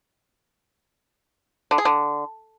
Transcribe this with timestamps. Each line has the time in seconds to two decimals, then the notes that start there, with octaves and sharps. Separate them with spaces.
1.71 D3
1.78 G#4
1.85 D3